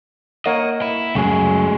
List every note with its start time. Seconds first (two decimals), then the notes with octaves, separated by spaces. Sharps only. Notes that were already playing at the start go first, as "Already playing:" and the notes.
0.46 A#3 C#5 D#5 F#5
0.82 E4
1.15 C#2 F#2 F#3 A3 G#4